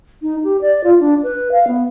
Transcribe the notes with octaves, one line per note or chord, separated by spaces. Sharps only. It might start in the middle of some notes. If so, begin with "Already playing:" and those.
D#4
G4
D5
F4
D4
B4
F5
B3